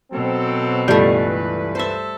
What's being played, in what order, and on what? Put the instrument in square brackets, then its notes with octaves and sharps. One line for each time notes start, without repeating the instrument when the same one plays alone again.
[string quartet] B2 [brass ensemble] F#3 C4 A4
[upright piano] C#2 G2 G6 [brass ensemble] E3 B4 [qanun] G3 A3
[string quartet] A4 [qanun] C5 E5